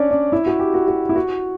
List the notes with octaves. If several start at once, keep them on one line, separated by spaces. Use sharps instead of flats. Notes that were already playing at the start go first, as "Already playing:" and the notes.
Already playing: C#4 D4 C#5 D5
D4
E4
F#4
G4
F#4
F#4
E4
F#4